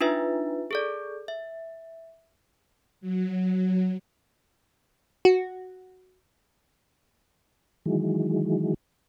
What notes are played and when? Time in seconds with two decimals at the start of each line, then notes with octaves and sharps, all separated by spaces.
0.01 D4 D#4 F4 B4 E5
0.71 G#4 A4 D5
1.28 E5
3.01 F#3
5.25 F#4
7.86 D#3 E3 F#3 G#3